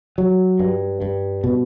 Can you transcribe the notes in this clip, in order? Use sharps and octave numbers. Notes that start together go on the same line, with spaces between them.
F#3
G2
G2
B2